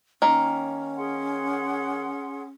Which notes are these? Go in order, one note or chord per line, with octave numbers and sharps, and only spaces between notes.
D#3 A#3 C#4
G#4 F#5 C6